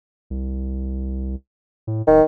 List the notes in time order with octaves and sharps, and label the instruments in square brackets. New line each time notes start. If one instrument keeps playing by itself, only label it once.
[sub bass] C2
A2
[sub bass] D1 [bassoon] D#3